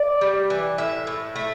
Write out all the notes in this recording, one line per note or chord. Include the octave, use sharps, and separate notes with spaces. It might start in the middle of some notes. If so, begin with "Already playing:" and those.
Already playing: D5
G3
E3
A2 E5
A2
A3